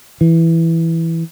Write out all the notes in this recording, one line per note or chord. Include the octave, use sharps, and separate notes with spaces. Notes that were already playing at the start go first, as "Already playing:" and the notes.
E3